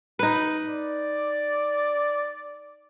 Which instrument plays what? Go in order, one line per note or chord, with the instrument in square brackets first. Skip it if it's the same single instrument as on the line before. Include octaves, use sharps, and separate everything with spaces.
[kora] D#4 B4
[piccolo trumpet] D5